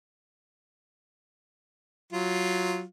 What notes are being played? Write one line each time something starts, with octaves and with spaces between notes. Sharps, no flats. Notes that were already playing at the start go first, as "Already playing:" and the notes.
F#3 F4